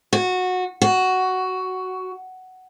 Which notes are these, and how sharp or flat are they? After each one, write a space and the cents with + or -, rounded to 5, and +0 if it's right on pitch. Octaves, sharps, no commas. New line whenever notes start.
F#4 -15
F#4 +10